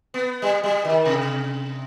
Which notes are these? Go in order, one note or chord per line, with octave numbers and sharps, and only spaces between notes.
B3
G3
G3
D#3
C3